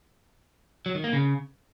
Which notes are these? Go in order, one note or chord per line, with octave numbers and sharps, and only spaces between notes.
F#3
D#3
A#3
C#3